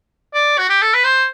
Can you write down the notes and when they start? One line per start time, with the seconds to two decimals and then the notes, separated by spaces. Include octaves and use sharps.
0.34 D5
0.58 F#4
0.69 G4
0.82 A4
0.94 B4
1.04 C5